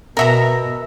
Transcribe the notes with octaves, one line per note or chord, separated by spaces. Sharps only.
B2 A#4 E5 A#5